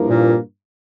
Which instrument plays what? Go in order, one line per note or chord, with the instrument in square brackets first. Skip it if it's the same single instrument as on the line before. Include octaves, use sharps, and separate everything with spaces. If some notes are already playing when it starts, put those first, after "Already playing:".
Already playing: [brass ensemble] G2 F3 A#3 E4 A#4
[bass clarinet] A#2